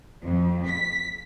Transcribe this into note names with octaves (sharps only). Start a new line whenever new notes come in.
F2
B6